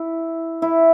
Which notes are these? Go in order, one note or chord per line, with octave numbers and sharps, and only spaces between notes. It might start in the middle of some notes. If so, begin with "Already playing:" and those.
Already playing: E4
E4